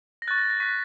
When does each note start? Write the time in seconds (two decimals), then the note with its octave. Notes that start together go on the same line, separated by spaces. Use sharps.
0.22 A#6
0.28 F#6 A6
0.31 C#6
0.38 A#6
0.50 A#6
0.60 C#6 F#6 B6